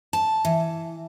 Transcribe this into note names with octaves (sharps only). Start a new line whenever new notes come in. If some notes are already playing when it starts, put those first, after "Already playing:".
A5
E3